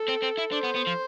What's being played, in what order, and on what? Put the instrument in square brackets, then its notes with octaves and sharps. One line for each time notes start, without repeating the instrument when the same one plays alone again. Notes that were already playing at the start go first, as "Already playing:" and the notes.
Already playing: [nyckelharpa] A4
[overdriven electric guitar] C4
C4
E4
[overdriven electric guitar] D4 [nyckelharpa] C5
[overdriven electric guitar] B3
B3
F3